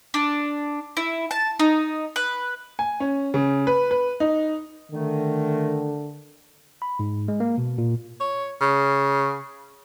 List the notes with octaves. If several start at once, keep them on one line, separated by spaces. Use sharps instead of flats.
D4
E4
A5
D#4
B4
G#5
C#4
C#3
B4
B4
D#4
D3 D#3 A3
B5
G#2
G#3
A#3
B2
A#2
C#5
C#3